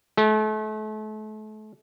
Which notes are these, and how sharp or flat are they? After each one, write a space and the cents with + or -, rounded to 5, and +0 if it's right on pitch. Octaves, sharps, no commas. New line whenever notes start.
A3 -35